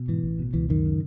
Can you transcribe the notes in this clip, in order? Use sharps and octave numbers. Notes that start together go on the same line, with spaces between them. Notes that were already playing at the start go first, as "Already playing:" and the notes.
Already playing: B2
G#2 E3
A1
B2
C#2 E3
F#2 D#3
C#3